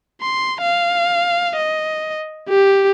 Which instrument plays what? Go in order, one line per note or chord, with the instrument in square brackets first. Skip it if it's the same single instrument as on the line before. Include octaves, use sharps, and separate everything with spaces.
[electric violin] C6
F5
D#5
G4